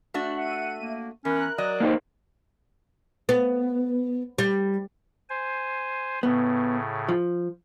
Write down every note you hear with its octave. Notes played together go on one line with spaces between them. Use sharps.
A3 D4 F#4
E5 F#5 D#7
A#3
E2 C#4 A#4 F#6
F#3 D5 D#5
A#3 D#4 C5
B3
G3
C5 G#5
A2 C#3 B3
F3